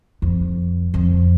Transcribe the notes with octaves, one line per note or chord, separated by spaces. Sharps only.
F2
F2